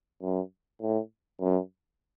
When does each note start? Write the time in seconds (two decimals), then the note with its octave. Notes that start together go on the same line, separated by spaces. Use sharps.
0.22 F#2
0.81 A2
1.40 F#2